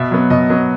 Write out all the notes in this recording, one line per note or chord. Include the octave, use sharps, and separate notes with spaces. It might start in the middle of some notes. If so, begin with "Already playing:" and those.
Already playing: B2 E5
F#3 B3
B2 D#5
F#3 B3